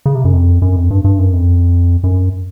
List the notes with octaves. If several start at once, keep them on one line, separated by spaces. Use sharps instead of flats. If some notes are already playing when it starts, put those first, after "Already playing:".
C#3
C3
F#2
F2
F#2
F2
G2
G2
F#2
F2
F#2